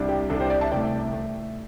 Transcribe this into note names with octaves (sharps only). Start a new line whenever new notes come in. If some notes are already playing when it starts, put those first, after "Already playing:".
Already playing: C2 C3 G3 D4
G4
C2 C3 G3 D4 A4
G4 C5
D5 G5
E5 A5
C2 C3 A3 D5 G5
A3